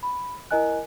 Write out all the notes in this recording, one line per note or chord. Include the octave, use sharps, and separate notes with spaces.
B5
E4 A#4 D#5 G#5 F#6